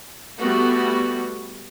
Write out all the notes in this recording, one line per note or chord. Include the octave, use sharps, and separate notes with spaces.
G3 A3 B3 F#4